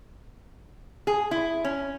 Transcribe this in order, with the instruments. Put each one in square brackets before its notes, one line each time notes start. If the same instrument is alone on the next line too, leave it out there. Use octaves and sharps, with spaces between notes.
[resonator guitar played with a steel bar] G#4
E4
C#4